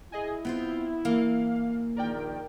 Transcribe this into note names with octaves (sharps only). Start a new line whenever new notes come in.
E4 G#4 D#5 G#5
B3 C4 F4 C5
E3 A#3 F5
A#1 D#3 A#4 D5 G5